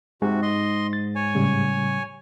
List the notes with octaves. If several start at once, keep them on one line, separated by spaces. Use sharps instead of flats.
G#2 C3 F#4
D#5 C6
A6
C#5 G#5
A2 C#3 G3